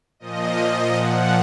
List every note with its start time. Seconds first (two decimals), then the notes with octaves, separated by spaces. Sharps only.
0.20 A#2 F3 D#5
0.93 A#2 F3 F#5